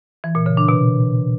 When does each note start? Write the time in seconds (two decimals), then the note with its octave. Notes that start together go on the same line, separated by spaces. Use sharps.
0.24 E3
0.35 A#2
0.46 C#3
0.57 D4
0.69 B2